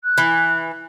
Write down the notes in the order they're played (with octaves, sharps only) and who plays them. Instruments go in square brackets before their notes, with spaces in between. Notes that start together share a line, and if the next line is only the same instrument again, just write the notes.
[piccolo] F#6
[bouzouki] E3